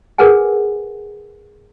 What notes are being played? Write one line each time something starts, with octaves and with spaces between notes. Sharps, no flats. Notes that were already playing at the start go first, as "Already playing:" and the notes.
G#4 A#4 B4 F#5 G#5